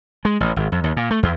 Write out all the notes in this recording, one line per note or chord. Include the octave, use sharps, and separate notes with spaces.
G#3
A1
G#1
F2
D#2
A#2
A3
E2